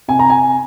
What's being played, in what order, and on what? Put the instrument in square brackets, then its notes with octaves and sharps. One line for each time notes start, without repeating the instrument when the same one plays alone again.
[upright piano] C3 G#5
A#5
G#5